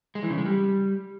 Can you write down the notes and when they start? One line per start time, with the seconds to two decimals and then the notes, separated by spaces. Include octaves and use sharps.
0.15 G#3
0.23 E3
0.30 C#3
0.38 G#3
0.45 G3